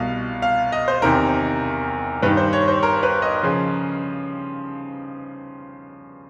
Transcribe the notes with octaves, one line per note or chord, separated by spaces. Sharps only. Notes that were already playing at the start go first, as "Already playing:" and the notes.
Already playing: C2 B2 F5
F5
D#5
C5
E2 C3 D#3 A#4
G2 D#3 B4
C5
C#5
C5
A#4
B4
D#5
C#3 F3